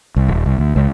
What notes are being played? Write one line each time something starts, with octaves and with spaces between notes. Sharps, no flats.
C2
D#1
C2
D2
C#2